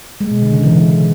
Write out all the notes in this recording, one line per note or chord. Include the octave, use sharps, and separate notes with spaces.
G#3
B2
D3
C#3
E3